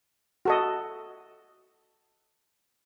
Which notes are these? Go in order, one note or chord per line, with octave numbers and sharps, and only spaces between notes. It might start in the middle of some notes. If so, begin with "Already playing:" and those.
F#4 A4 D#5